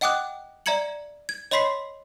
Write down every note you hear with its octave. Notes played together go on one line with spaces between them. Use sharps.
D#5 F#5 G5 D6 D#6 F#6
D5 E5 A#5 G#6 C#7 F#7
G#6
C#5 D#5 B5 C6 B6 C7